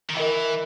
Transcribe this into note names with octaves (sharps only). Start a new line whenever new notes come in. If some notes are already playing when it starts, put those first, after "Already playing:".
D#3
E3 A#4 D#5 G5